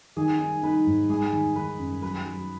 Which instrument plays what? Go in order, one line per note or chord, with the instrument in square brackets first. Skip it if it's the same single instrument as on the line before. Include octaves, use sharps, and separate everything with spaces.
[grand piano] D#3 [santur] G#4
[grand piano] D#4
[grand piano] D#4 [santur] B4
[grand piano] G#2
[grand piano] G#3 [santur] G#4
[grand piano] D#3
[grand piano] D#3 [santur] B4
[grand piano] F#2
[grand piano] F#3 [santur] B4
[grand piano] F#3